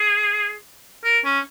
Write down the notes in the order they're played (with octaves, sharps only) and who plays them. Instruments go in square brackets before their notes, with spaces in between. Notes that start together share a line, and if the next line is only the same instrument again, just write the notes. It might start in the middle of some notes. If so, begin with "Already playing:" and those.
Already playing: [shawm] G#4
A#4
C#4